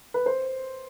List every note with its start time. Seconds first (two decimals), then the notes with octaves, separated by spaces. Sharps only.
0.14 B4
0.26 C5